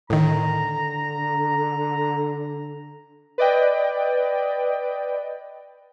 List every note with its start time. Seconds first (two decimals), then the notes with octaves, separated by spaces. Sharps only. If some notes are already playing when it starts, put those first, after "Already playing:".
0.10 A2 D3 D#3 A#5
3.38 B4 D5 D#5 G5